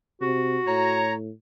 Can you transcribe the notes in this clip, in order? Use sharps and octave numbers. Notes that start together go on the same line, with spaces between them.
C3 F#4
A2 C#5 A#5